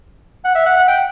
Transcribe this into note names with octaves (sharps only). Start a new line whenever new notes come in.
F#5
E5
F#5
F#5
G5